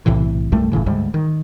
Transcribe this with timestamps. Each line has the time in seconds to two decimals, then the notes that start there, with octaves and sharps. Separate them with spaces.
0.06 B1 A2 C3 E3
0.52 C2 G2 G3 A3
0.72 G1 A2 C#3 E3
0.86 D2 G#2 G3
1.14 D#3